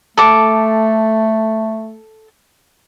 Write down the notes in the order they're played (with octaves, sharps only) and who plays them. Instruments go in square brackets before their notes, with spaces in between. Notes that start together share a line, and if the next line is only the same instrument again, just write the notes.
[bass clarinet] A3 [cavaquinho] A4 D6